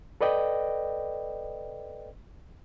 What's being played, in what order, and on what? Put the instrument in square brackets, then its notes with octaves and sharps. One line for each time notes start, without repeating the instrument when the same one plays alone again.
[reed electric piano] A4 B4 D5 D#5 G5